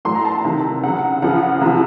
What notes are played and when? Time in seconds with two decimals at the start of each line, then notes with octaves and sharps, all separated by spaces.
0.05 A2 F#3 C6
0.15 A#5
0.25 A5
0.44 C3 D#3 F#3
0.84 C#3 F#3 F#5
1.22 C#3 F3 F#5
1.61 C3 F3